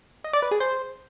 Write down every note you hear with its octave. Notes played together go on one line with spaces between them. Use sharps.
D#5
D5
B4
G#4
C5